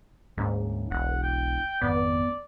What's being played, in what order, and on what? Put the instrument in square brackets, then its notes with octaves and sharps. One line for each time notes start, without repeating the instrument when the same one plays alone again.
[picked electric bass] D2 A#3 C#4 [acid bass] G#2
[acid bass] E1 [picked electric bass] B1 [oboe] F#5
[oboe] G5
[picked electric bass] G#1 F2 D#3 [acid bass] B3 [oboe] D5